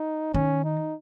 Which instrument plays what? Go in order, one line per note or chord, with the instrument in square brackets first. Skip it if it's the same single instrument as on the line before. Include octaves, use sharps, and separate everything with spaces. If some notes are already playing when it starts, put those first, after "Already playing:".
Already playing: [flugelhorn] D#4
[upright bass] D#3 [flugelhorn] C#4
[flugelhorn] D#4